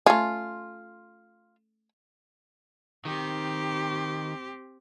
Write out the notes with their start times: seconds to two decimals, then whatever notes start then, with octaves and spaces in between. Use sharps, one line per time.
0.06 A3 C#4 F4
3.05 D#3 C4 G4